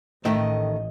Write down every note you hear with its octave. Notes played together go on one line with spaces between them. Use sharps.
A1 A2 D#3 A3 D#5